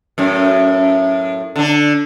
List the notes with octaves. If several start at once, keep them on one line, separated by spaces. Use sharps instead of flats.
F#2 A2
D3 D4